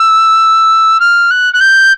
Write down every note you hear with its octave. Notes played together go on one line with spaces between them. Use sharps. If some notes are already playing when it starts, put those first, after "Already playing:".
Already playing: E6
F6
F#6
F#6
G6